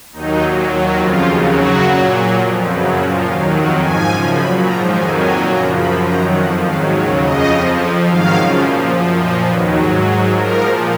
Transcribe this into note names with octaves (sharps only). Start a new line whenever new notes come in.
D#2 D#3 F#3 D#4
A#2 F#3
D#2 D#3 F#3
F2 C#3 F3 F4
D#2 C#3 F#3
F#2 C#3 F#3 F#4
A#2 F#3
A#2 F#3 G#4
F2 F3 A#4
F#2 C#3 F#3 B4
A#2 F3 C#5
D#2 D#3 F#3 F5
F2 D#3 F#3 F#5
G#2 F3 G#5
F#2 C#3 F3
A#2 F#3 B5
G#2 F3 A#5
F2 D#3 F#3 G#5
A#2 F#3 G#5
F#2 C#3 F3 A#5
F#2 F3 B5
F#2 D#3 F#3 A#5
F2 F3 F#5
G#2 D#3 F#3 F5
D#2 C#3 F#3 C#5
F2 C#3 F3 D#5
F2 F3
F2 F3
G#2 D#3 F#3 F5
F#2 C#3 F3
A#2 F3
F#2 F3
A#2 F3 D#5
D#2 D#3 F#3 B4
G#2 F#3 G#4
G#2 F#3 G#4
G#2 F3 A#4
A#2 F3